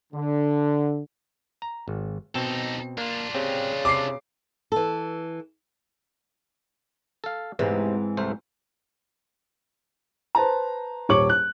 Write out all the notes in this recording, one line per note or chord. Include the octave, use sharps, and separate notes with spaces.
D3
A#5
G#1
B2 C4 D#4 A4 A5
A#3 D4 F4
C#3 C4 G4
C3 D6 C7
E3 A4
A4 F5
E2 G#2 C3 E3 C4
C2 A3 C5
B4 C5 A5 A#5
D#1 C#5 C#6 D6 F#7
F#6